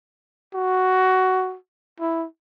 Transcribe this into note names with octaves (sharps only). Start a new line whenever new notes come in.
F#4
E4